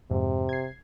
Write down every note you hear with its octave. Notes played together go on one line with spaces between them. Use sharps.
F2 G#2 C3
G#6 C7